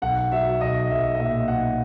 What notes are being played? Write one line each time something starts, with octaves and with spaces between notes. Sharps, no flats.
B1 F#5
F#3 E5
B1 D#5
B1 E5
D#5
A#2 E5
B1 F#5